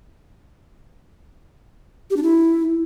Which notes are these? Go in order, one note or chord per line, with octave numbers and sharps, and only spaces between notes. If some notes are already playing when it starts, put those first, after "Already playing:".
G4
D4
E4